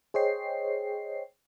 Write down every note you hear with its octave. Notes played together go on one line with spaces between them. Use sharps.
G#4 C5 C#5 D#5 G5 C7